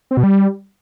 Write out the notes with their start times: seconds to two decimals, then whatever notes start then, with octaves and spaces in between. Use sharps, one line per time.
0.11 C4
0.17 B2
0.24 G3